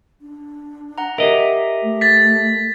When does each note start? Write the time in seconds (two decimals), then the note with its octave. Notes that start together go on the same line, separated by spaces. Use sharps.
0.21 D4
0.98 F#5 A#5
1.18 G4 A#4 D#5 E5
1.82 A3
2.01 A6 B6